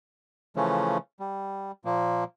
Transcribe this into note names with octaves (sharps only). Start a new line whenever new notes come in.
C#3 E3 F3 A3 C#4
G3
A#2 F3 A#3